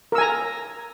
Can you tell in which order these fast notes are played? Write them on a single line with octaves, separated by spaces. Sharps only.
A#4 E6 G#5 A#5